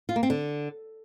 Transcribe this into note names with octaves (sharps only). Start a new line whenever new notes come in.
F4
A#3
C4
D3